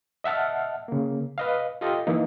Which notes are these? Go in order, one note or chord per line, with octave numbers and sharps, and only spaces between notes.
D#5 E5 F#5 A5 F6
C#3 A#3
B4 D#5 F5
F4 G4 A4 D#5
E3 A#3 D#4